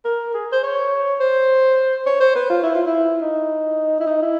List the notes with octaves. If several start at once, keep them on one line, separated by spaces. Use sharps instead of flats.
A#4
G#4
C5
C#5
C5
C#5
C5
B4
F4
E4
F4
E4
D#4
E4
D#4
E4